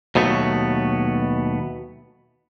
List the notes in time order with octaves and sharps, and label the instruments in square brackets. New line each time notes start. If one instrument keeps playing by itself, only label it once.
[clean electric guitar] D#2 B2 F#3 A3 B3